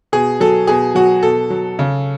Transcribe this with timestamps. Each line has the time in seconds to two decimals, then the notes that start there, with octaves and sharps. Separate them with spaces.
0.12 B2 G#4
0.40 F#3 A4
0.67 B2 G#4
0.95 F#3 F#4
1.23 B2 A4
1.50 F#3
1.79 C#3